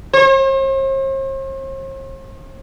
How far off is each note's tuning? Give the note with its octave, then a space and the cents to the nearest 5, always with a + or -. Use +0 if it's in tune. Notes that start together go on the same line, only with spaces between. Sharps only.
C5 +45